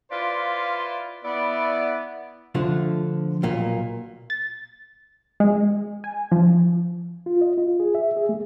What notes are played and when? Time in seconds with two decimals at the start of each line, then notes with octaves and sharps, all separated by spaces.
0.11 E4 F4 B4 C5 D5 F5
1.24 B3 E4 D5
2.55 D3 F3 A3
3.43 B1 A#2 A#3
4.30 A6
5.40 G#3
6.04 G#5
6.32 F3
7.26 F4
7.41 D#5
7.58 F4
7.80 G#4
7.95 E5
8.17 G#4
8.29 A3